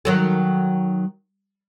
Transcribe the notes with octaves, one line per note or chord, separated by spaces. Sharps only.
D#3 F#3 A4